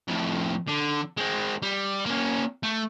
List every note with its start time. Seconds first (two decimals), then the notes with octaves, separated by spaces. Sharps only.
0.08 F2 A2
0.68 D3
1.17 G#3 C4
1.62 G3
2.06 A#3 C#4
2.63 A3